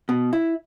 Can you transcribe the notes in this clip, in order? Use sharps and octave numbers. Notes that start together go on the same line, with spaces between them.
B2
E4